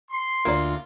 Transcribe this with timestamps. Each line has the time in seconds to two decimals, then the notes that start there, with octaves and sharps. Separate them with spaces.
0.10 C6
0.45 D2 A#3 F4 D5